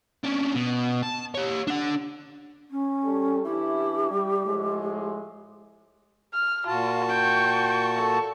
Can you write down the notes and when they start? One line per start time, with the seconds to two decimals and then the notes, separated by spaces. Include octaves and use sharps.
0.24 C#4 D4
0.55 B2
1.03 A5
1.35 G4 C#5
1.67 D4 F#5
2.71 C#4
3.04 G3 A4
3.45 E3 D4 E4 G4
4.11 G3
4.46 A2 F3 G#3
6.34 F6
6.67 A#2 F4 F#4 A5
7.09 G5 C#6
7.96 A4